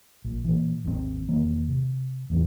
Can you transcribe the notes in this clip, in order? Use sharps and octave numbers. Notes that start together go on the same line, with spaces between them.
A#1
A#2 E3
G#1 D#2 C#3 C4
E1 D#3 A#3
C3
A1 E2 E3 C4